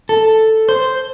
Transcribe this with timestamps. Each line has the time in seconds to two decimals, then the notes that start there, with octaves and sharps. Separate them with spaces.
0.09 A4
0.69 C5